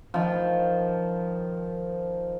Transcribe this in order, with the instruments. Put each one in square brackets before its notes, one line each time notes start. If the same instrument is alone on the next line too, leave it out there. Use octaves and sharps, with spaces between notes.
[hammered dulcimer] D#3 F3